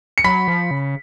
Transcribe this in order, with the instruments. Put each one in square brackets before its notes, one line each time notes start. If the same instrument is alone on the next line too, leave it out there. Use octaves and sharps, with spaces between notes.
[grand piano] C#7
[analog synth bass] F#3 [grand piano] B5 B6
[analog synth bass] F3
C#3